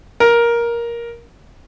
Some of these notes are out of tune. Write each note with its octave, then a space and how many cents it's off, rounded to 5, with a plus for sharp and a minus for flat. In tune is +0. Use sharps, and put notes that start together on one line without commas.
A#4 +10